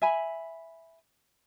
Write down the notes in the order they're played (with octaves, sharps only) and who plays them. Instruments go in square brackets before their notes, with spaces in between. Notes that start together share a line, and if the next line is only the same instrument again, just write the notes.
[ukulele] E5 G#5 B5